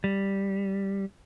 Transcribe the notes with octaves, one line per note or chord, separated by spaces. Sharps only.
G3